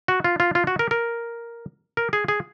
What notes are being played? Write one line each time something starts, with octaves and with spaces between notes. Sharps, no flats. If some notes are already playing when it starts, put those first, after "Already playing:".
F#4
F4
F4
F4
F#4
A#4
A#4
A#4
G#4
G#4